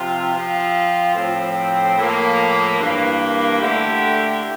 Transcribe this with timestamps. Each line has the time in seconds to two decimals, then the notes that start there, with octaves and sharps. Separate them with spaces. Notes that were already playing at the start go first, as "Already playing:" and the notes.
Already playing: C3 F3 C4 F4
0.32 F3 C4 F4
1.14 A2 F3 C4
1.96 A2 F3 A#3
2.79 G2 E3 A#3
3.61 D3 A3 E4 G4